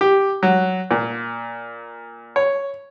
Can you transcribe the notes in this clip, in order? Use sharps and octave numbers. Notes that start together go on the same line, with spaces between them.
G4
F#3
A#2
C#5